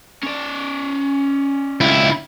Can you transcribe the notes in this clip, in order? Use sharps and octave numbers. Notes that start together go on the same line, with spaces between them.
C#4 D5
C#2 E4